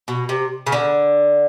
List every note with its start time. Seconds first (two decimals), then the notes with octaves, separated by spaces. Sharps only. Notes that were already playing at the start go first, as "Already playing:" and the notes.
0.08 B2
0.29 C3
0.67 C#3
0.72 D3